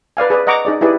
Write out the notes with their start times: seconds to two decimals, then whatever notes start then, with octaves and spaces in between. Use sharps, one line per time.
0.17 B4 D5 F5 G#5
0.30 G#4 B4 D5
0.47 D#5 F#5 A#5 C#6 D6
0.65 D#4 G#4 D5
0.81 E4 G4 G#4 B4 D5